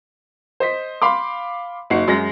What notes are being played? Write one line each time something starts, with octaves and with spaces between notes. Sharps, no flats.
C5 D#5 B6
F5 B5 C6 D6
F#1 D#4 F#4 F#5 C7
F#2 G#3 A#6